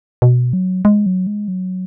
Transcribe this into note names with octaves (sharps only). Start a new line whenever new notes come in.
B2
F#3
G#3
F#3
G#3
F#3